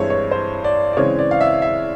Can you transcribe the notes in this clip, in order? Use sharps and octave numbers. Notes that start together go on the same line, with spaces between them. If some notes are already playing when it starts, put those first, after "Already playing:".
Already playing: G2 E3 G#3 C4 E4 C#5
C#5
C5
D5
D5
C#3 E3 G#3 C4 C#5
D5
F5
E5
E5